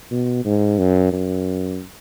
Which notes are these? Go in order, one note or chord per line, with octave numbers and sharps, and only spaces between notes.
B2
G#2
F#2
F#2